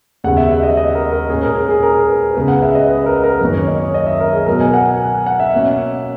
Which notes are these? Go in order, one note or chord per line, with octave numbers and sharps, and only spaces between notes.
D#2 C#3 G#3 B3 F#5
E5
E5
D#5
D#5
A#4
A#4
A#2 G#3 C#4 G#4
A#4
G#4
G#4
A#4
B4
C#2 C#3 G#3 B3 B4
F#5
E5
D#5
B4
A#4
A#4
F#2 D#3 A#3 C#4
C#5
D#5
C#5
D#5
E5
A#4
G#4
B2 F#3 B3 A#4
G#5
F#5
G#5
F#5
E5
B2 A#3 C#4